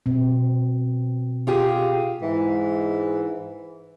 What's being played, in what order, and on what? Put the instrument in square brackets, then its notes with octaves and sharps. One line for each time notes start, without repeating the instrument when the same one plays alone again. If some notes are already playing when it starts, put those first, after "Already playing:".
[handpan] B2 C4
[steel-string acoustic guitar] F4 G4 G#4
[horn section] G#2 E3